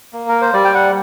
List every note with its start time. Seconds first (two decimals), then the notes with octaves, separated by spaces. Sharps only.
0.13 A#3
0.29 A#4
0.42 C5
0.53 G3 D5
0.65 G5
0.74 F#5